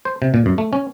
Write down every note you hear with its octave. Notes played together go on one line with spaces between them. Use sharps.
C5
C3
A#2
F#2
A3
C#4